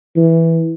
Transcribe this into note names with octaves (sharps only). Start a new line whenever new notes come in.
E3